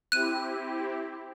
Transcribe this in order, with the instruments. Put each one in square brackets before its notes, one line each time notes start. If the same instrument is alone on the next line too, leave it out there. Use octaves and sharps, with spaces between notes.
[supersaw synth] C4 E4 G4 [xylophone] F#6 D#7